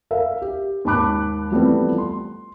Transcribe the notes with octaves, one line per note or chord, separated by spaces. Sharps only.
A#4 E5 F5
G4
D#2 G#2 A5 B5 D6 F#6
E3 F3 G3 A3 B3 C4
C6